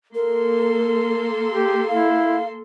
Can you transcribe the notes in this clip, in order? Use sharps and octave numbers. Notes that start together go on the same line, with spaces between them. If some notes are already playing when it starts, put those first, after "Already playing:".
A#3 A4 A#4 C6
G4
E4 F5